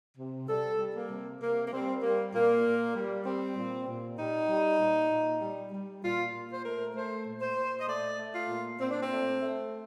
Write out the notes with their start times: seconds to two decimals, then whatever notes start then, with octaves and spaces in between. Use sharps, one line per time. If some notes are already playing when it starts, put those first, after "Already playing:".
0.17 C3
0.49 G3 A4
0.79 G3
0.94 A#3
1.10 C3
1.41 C3 A#3
1.67 A#3
1.72 G3 C4
2.02 G3 A#3
2.33 A#2 A#3
2.64 A#2
2.94 G3
3.25 G3 C4
3.56 A#2
3.87 A#2
4.18 G3 D#4
4.49 G3
4.79 A#2
5.11 A#2
5.41 G3
5.72 G3
6.03 A#2 F4
6.33 A#2
6.52 C5
6.64 A3 A#4
6.94 A3 C5
7.26 A#2
7.41 C5
7.56 A#2
7.80 D#5
7.87 A3 D5
8.17 A3
8.33 F4
8.49 A#2
8.79 A#2 C4
8.90 D4
9.01 C4
9.10 A3
9.41 A3